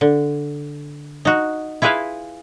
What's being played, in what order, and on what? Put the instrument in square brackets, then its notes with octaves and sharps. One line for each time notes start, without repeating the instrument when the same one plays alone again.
[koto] D3
D#4 F#4
E4 F4 G#4 B4 E5 F5